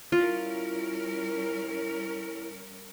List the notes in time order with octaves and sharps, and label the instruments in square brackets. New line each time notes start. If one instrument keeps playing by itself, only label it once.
[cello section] G3 C#4 A#4 [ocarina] E4 [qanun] F4